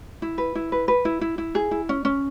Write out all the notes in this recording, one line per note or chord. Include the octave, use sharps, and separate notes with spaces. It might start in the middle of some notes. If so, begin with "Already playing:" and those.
E4
B4
E4
B4
B4
E4
E4
E4
G#4
E4
C#4
C#4